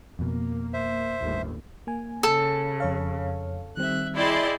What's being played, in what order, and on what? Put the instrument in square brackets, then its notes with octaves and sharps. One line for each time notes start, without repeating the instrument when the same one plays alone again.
[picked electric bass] F2 B2 [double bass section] A#3
[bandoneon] C5 E5
[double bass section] G1 D#2 A2
[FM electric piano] A#3 G#5
[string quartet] C#3 [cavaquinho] A4
[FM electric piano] F2 C#5 F5
[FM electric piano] D#3 G3 C4 [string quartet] E5 F#6
[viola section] E4 D5 C6 [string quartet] G#4 D#5 G5